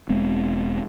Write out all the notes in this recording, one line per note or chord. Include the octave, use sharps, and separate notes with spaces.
E1 G#3 B3 C4